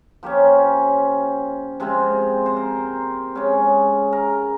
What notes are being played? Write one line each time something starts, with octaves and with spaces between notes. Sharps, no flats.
F3 A#3 C#4 G4
C3 F3 G#3 C4
C5
A#4
C#3 G#3 C#4
A#4